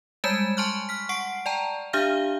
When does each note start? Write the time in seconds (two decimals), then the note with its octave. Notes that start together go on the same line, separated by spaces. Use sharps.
0.24 G3 G#3 G#5 A5 G6 E7
0.57 G#5 A5 C6 C#6 F6 F#6
0.89 F6 B6
1.09 F#5 C#6 C7 D7
1.46 D5 G5 A5 A#5
1.93 D4 G4 E5 F5 F6 G6